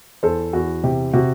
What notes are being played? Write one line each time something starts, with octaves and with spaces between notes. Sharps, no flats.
E2 A4 C5
E2 F#4
C3 G4
C3 F#4